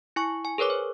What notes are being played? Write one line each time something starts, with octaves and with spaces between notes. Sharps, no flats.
E4 G#5 C#6
G#5
G#4 A#4 B4 C#5 D6
C5